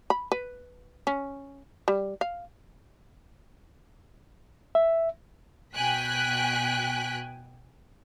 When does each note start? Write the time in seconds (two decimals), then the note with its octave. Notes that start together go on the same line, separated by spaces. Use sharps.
0.10 B5
0.32 B4
1.07 C#4
1.88 G3
2.21 F5
4.75 E5
5.74 B2 G5 G#5 F#6 B6